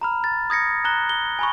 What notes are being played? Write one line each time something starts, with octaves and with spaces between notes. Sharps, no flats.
A#5 B5 F6
A6
D#6 G#6 A#6 C#7
A#5 F#6 G7
G7
G#5 B5 C#6